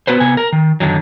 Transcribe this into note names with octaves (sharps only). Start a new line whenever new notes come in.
B3 F#4 B4 C5
C3 B3 G#5
A#4
D#3
F#2 D3 D#3 F#3